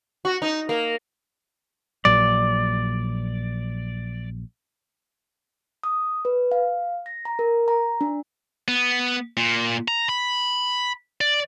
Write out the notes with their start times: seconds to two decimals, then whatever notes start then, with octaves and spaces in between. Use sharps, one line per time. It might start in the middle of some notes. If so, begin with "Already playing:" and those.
0.25 F#4
0.42 D#4
0.69 A#3
2.05 A#1 A#2 F#3 D5
5.83 D#6
6.25 B4
6.52 F5
7.06 A#6
7.25 A#5
7.39 A#4
7.68 A#5
8.01 D4
8.68 B3
9.37 A#2
9.88 A#5
10.09 B5
11.21 D5